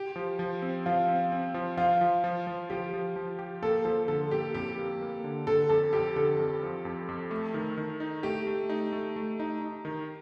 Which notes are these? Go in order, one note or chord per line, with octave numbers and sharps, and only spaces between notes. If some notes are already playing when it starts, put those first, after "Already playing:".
Already playing: G4
F3
F3
C4
F3 F4
C4
C4
F3
F3 F4
F3
F3
F3
F3 G4
F3
F3
G4
A#3 A4
F3 A4
D3 A4
A#3 G4
F2 G4
A#3
A#3
D3
D3 A4
F2 A4
F2 G4
D3 A4
F2
F3
F2
F2
A3
D#3
D#3
D#4
A3 G4
A3
D#4
A3
A3
D#4
D#4
D#3